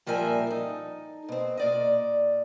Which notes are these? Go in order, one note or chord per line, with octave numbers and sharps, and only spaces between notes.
A#2 F3 G3 A#4 E5 G#5
D#4 A4
B2 C4
A#2 D5 D#5